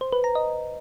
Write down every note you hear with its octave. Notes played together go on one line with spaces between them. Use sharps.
C5
B4
A#5
D#5